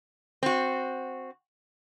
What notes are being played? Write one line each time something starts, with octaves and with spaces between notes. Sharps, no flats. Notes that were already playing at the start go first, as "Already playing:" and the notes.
C4 F#4